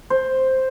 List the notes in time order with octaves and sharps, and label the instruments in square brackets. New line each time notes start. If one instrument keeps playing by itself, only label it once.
[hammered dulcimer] C5